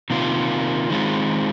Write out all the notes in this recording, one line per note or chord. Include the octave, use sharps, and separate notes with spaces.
C3 D#3 A#3 F4
D#3 G#3 C4 F4